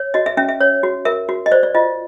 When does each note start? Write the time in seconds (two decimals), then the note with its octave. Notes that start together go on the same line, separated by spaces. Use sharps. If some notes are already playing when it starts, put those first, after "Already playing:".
Already playing: C#5
0.14 F#4 D#5
0.26 E5
0.37 C#4 E5
0.49 E5
0.61 C#5
0.83 F#4
1.05 A#4 E5
1.29 F#4
1.46 D#5
1.52 C5 D5
1.63 D5
1.75 F4 D#5